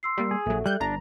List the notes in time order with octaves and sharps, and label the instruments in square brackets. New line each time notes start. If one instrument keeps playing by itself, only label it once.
[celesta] C6 E6 C7
[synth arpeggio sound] G3 A#3
[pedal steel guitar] G#4
[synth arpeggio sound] A#1 F#3 [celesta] A4 E5
[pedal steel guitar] G3 [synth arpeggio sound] F#6 G6
[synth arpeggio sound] G1 A#5 [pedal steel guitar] D4